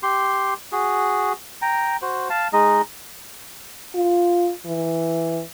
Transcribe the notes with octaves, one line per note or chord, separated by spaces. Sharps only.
G4 C6
F#4 G#4
G5 A#5
F#4 C5
F5 A5
G#3 D#4 D#5
F4
E3